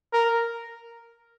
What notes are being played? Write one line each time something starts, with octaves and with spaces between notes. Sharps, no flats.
A#4